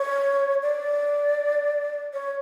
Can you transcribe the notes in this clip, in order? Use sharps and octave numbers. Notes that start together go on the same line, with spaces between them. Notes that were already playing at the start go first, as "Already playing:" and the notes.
Already playing: C#5
D5
C#5